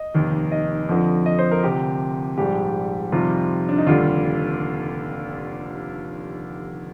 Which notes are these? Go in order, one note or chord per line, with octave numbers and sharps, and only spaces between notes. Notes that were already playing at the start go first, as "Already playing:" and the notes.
Already playing: D#5
F1 D#2 D#3
D#5
F2 D3 F3
D#5
C5
A#4
D2 C3 F3 G4
A#1 G#2 G3 G4
F2 C3 D#3 G3 F4
D4
D#4
F1 D#2 D3 G3 F4